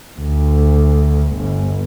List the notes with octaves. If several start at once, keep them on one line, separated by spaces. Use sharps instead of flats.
D2
G1